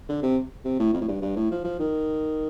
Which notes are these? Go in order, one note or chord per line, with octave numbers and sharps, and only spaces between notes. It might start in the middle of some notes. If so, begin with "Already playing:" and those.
D3
C3
C3
A2
F2
A2
G2
G2
A2
F3
F3
D#3